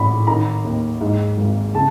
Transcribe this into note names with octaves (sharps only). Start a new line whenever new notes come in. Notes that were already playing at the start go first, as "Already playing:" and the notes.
Already playing: A1 G#2 B5
D#3 A#5
D#2
G#2
G#1
C#3 A5